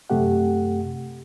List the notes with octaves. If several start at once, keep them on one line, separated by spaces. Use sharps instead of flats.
F#2 C3 A3 G4 F#5